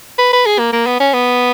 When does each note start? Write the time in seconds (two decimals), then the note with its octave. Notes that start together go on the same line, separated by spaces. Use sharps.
0.18 B4
0.33 B4
0.46 G#4
0.59 A#3
0.73 A#3
0.87 B3
1.00 C#4
1.13 B3